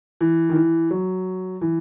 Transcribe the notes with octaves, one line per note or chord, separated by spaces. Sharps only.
E3
D#3
E3
F#3
E3